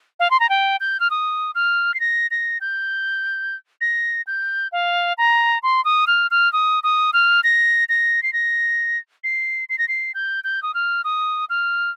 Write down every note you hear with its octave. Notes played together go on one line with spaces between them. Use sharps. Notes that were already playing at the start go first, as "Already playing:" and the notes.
F5
C6
A#5
G5
G6
F6
D#6
F6
C7
A#6
A#6
G6
A#6
G6
F5
A#5
C6
D#6
F6
F6
D#6
D#6
F6
A#6
A#6
C7
A#6
C7
C7
A#6
C7
G6
G6
D#6
F6
D#6
F6